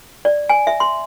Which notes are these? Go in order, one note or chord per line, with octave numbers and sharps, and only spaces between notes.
D5
G#5
E5
C6